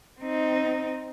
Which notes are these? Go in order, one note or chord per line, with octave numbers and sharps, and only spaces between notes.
C4 D#4